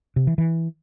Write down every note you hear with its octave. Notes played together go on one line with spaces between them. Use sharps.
C3
E3
E3